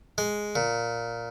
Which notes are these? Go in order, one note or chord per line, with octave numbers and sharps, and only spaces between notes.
G#3
A#2